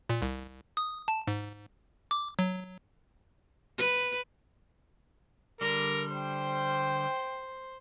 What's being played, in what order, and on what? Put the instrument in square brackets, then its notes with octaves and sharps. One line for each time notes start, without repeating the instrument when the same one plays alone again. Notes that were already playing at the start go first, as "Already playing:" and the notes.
[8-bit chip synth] A#2
C2
D#6
A5
G#2
D6
F#3
[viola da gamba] B4
[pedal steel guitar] D3 G3 [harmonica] A#4
[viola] C5 [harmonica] G5